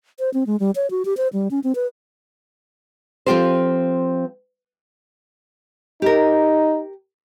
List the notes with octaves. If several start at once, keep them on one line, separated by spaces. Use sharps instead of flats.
C5
C4
G#3
G3
C#5
F#4
G4
C5
G3
C#4
C4
B4
F3 C4 F4 G4 A4 C5
D#4 G4 A#4